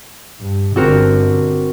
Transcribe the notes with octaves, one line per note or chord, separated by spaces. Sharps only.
G2
G1 D3 C4 F#4 A#4